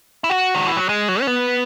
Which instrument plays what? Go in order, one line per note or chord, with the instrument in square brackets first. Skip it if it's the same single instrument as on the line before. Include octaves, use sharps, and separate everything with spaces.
[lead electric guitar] E4
F#4
D#3
E3
F#3
G#3
F#3
C#4
B3